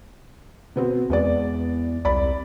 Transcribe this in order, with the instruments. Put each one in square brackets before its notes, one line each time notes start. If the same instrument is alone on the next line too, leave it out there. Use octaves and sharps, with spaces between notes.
[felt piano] B2 B3 C4
[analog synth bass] E2 [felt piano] G#3 B3 D5
[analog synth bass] C2 [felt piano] D5 B5